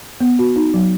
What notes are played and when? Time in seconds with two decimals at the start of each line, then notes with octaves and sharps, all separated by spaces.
0.20 B3
0.39 F#4
0.56 D#4
0.74 F#3